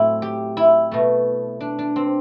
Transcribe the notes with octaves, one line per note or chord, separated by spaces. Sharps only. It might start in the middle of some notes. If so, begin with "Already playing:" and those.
Already playing: A2 F#3 C4 E4
G4
E4
B2 A3
D4
D4
C4